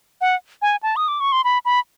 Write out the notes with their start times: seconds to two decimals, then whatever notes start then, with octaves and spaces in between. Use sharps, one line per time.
0.21 F#5
0.62 G#5
0.83 A5
0.96 D#6
1.08 D6
1.20 C#6
1.32 C6
1.44 B5
1.65 B5